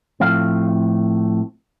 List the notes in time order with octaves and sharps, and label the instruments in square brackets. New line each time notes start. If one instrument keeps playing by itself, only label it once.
[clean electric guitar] A2 F3 A3 C4 F5